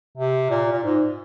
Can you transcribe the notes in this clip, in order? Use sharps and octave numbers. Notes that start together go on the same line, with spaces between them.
C3
A#2
A#2
G#2